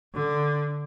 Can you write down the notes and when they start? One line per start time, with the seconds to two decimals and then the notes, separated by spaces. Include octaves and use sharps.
0.14 D3